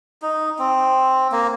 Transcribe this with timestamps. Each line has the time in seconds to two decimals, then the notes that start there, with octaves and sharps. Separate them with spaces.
0.22 D#4
0.59 C4
1.32 A#3